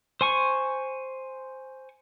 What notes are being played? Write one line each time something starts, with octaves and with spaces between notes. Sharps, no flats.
C5 G#5 C#6